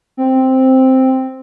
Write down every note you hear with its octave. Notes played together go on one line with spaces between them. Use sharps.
C4